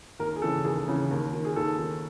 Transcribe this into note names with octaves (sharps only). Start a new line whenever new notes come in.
D#2 A#4
G#4
C#3 E3 A4
D#2 G#4
C#3 E3
D#2
D#3
G#4
D#2 A4
D#3